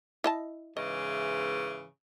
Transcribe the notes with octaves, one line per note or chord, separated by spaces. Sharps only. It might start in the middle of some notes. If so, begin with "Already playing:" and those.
E4 D#5 A5
G#2 C#3 E3 D#5